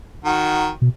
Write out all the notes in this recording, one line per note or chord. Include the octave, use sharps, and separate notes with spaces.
D#3 F#4
B2